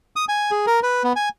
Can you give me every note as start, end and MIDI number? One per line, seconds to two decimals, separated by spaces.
0.16 0.25 87
0.29 0.51 80
0.51 0.66 68
0.67 0.80 70
0.83 1.03 71
1.04 1.13 59
1.16 1.29 80